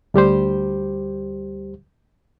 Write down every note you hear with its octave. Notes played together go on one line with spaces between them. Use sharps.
D2 G3 G4 C5